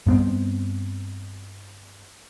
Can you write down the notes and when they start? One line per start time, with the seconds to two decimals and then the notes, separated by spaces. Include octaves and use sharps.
0.07 G2 B3 C4